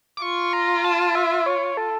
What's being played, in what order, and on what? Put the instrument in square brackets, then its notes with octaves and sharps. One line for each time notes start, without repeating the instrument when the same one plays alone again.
[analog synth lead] D6
[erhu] F4 [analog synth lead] C#6
[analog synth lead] A#5
A5
E5
C#5
A4